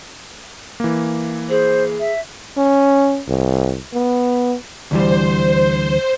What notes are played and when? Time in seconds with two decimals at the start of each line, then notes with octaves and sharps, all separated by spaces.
0.80 E3 A#3
1.50 G#4 C5
2.00 E5
2.57 C#4
3.28 C2
3.94 B3
4.91 D2 E3 G3 C5